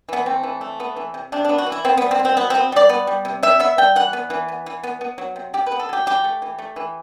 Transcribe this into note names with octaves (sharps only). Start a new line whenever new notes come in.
E3 B3
A3 C4
E3
A3
B3
E3
C3
C3 D4
B3 D4
F#4
E3
E4
B3 C4
G3 B3
C4
B2
C4
B2 B3
C4
B3
G3 D5
B3
G3
C3
C3 E5
B3 E5
G3 G5
E3 F#5
B3
E3
B3
E3
B3
B3
F#3
C3
C3 G4
B4
B3
A4
F#3 G4
E3 G4
A3
E3
A3
E3